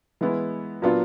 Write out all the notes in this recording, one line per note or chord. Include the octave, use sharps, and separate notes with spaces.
E3 G#3 B3 E4
A#2 F#3 B3 D4 F4